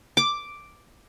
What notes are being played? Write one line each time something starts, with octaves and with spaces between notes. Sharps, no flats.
D6